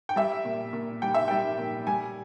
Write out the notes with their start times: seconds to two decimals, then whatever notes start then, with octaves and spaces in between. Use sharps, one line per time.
0.09 G5
0.16 G3 E5
0.45 A#2
0.73 A#2
1.02 G3 G5
1.14 E5
1.28 G3 G5
1.58 A#2
1.87 G3 G#5